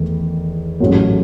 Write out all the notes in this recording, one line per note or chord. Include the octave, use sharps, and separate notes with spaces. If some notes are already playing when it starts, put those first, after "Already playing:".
Already playing: E2 D#3 A3
A1 G#2 F#3 A3